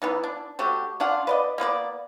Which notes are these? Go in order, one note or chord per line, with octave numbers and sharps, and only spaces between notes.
E3 B3 D#4
D4
D3 A3 F#4 G4
C#4 D4 F4 F#5
B4 D5 D#5
A#3 B3 B4 D5